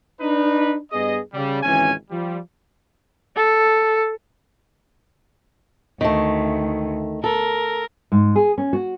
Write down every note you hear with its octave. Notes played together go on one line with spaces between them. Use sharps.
D4 D#4 B4
G2 B3 G#4 D#5
C#3 G3
G#1 C#2 E3 C#4 G#5
F3 G3
A4
D2 D#3 A3
A4 A#4
G#2
G#4
C#4
F#4